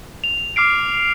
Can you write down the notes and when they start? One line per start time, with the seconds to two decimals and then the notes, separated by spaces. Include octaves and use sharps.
0.24 F7
0.56 D6 F6 C7 D7